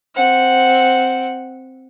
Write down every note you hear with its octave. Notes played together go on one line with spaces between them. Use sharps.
C4 F#5